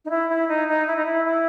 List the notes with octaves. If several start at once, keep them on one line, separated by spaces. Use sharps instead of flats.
D#4
E4
E4
D#4
D#4
E4
D#4
E4
E4